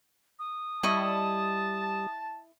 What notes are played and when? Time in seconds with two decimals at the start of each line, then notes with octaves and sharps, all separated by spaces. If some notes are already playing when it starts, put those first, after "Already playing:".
0.39 D#6
0.83 G3 E4 D#5 A5 C#6